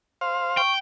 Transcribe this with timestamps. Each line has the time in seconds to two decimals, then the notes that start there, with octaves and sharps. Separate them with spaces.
0.21 C5 F5
0.57 G5 C#6